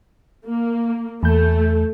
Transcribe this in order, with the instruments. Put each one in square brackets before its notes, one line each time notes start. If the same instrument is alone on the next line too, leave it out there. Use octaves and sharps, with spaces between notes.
[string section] A#3
[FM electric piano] E2 G6 [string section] A3